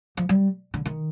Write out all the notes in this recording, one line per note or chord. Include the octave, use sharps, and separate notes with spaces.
F3
G3
D3
D#3